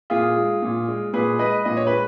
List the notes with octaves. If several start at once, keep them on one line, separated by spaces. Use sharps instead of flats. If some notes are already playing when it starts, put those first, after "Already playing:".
A#2 F4 G#4
G#3
A#2
G#3
A#2 G#4 B4
G#3 B4 D#5
A#2 D#5
C#5
G#3 B4